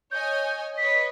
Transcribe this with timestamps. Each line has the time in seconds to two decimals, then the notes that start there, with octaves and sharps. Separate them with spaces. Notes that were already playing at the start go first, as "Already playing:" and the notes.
0.11 C#5 D#5 G#5 G6
0.78 B4 C#5 D#5 B6